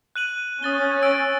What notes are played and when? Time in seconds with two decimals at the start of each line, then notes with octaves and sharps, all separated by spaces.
0.16 F#6 D#7 F#7
0.63 C#4 D#6 A6 G7
1.02 E6 A6 D7